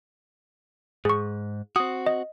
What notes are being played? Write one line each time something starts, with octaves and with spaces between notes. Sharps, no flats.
G#2 G#4 C#6
C4 F#4 D#6
D#5